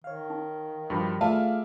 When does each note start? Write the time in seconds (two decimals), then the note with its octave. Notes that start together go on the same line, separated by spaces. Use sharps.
0.04 D#3 C#5 F5
0.30 D#4
0.90 G2 F3 G3 F#4 B5 C#6
1.21 A3 F4 G#4 D5 E5 F5 A5